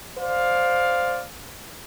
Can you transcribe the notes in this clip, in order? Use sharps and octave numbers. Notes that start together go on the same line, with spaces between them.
C5 D5 F5